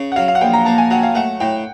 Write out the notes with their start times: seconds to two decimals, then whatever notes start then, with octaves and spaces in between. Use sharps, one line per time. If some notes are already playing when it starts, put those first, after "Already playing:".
Already playing: C#3
0.12 F#5
0.16 F#3 F5
0.28 F5
0.35 F#5
0.41 A#1 G5
0.53 A#5
0.65 A#3 A5
0.78 G#5
0.91 F#3 F#5
1.03 F5
1.15 A3 F#5
1.40 A2 G5